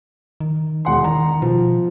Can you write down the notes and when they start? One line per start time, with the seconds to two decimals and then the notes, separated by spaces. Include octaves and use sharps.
0.40 D#3
0.85 E1 F#5 C6
1.04 D#3 A#5
1.42 B2 F3